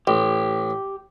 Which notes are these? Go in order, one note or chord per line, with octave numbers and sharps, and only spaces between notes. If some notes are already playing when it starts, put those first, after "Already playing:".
A1 G4